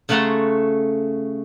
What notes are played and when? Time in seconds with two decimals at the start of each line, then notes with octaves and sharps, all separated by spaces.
0.09 C#3 A3 F#5 A5 A#5 C6